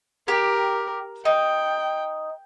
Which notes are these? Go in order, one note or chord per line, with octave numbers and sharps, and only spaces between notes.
G4 A#4
D#4 G5